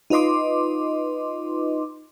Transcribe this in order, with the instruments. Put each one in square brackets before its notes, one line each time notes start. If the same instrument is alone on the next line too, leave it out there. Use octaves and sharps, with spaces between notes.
[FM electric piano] D#4 F4 B4 D#5 C6 D6